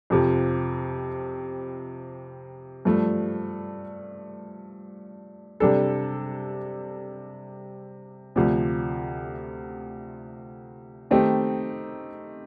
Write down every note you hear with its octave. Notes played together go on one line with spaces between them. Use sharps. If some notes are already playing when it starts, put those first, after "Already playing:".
F2 C3 F3
G2 F3 A3
C3 G3 D4 A4
D2 C3 F3
D#3 A3 C4 D#4 G4